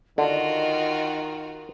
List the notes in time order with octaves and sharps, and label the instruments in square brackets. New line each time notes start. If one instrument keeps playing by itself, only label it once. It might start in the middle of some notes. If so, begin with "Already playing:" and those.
[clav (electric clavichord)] D3 [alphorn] D#3 [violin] F4 F#4 [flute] D#5